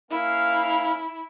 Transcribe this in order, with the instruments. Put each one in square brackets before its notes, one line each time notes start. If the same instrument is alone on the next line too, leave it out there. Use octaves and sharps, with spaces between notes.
[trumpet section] A#3 C#4 F5 [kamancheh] E4